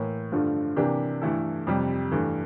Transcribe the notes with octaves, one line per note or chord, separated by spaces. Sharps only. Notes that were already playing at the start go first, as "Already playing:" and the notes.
Already playing: A2 E3 A#3
G2 D3 F3 A3
C3 E3 A#3 D4 G4
G2 E3 A3 E4 A4
F2 C3 G3
G2 E3 A3